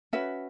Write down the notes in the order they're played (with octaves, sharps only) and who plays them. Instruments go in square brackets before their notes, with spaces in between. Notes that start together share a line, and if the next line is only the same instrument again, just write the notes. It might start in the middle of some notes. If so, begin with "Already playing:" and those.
[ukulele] C#4 F#4 B4 E5